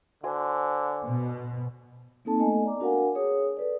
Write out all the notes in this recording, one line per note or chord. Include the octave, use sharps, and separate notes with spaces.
D3 F#4 C5 G#5
B2
A#3 C4 D#4 A4 A5
A3 B3 A4 D#5 G#5
D5 A#5 D6
D4 F#4 A#4 F5 F#5 G#5
G#4 C#5 D#6
A4 B4 D5